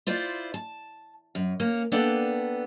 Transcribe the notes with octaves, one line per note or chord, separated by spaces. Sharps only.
E4 F4 C5 D5
A5
F#2
A#3 C#4
A#3 B3 D4 A4 D5 G5